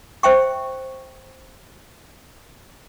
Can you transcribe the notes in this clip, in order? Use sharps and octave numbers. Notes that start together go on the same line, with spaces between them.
C5 E5 G5 C#6